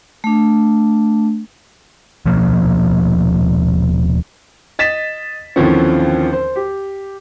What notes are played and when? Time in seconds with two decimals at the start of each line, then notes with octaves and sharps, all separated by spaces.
0.24 A3 D4
2.26 D#1 B2 F3 A#3
4.79 D#5 A6 B6 E7
5.56 D#2 D3 E3 F3 C4 C#4
6.33 C5
6.56 G4